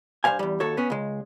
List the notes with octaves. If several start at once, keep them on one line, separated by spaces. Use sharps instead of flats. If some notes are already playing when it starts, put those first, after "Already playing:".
G2 E3 C5 F5 G#5
E2 G3
D#2 F#4 A4 C#5
B3 C#4
C#2 G#3